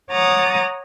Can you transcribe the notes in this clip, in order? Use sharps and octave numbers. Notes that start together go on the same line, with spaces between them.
C#5 F#5 A#5 D6 D#6 A6